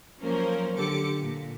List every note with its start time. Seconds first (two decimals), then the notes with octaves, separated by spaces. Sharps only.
0.20 F3 F#3 A#3 C#4 A#4 C5
0.77 D3 G4 A4 D6 C#7
1.19 A#2